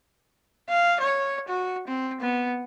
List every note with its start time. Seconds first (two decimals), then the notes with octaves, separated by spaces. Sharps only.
0.69 F5
1.00 C#5
1.48 F#4
1.88 C4
2.21 B3